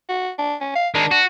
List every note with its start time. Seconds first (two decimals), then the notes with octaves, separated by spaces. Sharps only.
0.09 F#4
0.38 D4
0.61 C#4
0.75 F5
0.95 D#3 G#3 D4
1.11 F#4